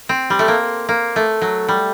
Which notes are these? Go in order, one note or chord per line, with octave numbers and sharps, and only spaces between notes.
C4
G3
A3
A#3
A#3
A3
F#3
G3